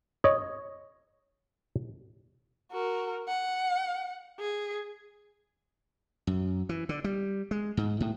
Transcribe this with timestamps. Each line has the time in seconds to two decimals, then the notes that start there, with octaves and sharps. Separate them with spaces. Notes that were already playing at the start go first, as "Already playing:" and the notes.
0.24 C#5 D#5
2.72 F#4 A#4
3.28 F#5
4.39 G#4
6.27 F#2
6.69 E3
6.89 D3
7.04 G3
7.51 G#3
7.77 G#2
8.00 A2